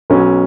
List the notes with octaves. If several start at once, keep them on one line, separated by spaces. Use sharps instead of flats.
B1 B2 F#3 C#4